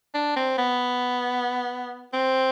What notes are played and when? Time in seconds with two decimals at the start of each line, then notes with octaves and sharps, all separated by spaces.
0.15 D4
0.36 C4
0.58 B3
2.14 C4